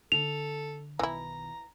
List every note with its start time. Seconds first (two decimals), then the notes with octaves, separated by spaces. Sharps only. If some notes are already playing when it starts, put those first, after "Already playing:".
0.12 D3 A4 F7
0.99 B1 D#3 E3 E4 A#5